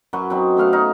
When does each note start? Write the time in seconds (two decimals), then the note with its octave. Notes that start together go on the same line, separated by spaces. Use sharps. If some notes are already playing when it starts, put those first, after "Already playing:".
0.13 F#2 F#3 B4 C#6
0.30 F#3 C4 D#4
0.57 A3 B3 F5 F#5
0.73 D#4 F5